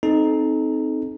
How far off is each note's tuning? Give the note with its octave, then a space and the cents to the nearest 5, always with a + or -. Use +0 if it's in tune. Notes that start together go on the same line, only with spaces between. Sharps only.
C4 +0 D#4 +0 A4 -35